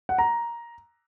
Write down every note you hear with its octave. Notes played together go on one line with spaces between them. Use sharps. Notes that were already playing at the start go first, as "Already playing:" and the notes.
F#5
A#5